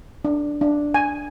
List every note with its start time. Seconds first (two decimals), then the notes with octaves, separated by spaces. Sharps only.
0.25 D4
0.61 D4
0.94 G#5